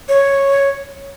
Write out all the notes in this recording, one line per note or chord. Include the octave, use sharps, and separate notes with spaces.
C#5